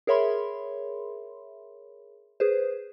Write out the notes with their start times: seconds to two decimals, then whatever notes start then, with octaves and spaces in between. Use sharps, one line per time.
0.07 G#4 A#4 C#5 E5 B5 C6
2.40 G#4 B4 C5